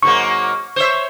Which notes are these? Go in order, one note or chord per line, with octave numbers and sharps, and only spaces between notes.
G#2 F#3 A#3 C#6
C5 C#5 E5